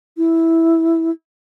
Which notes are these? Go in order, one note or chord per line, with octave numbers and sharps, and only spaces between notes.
E4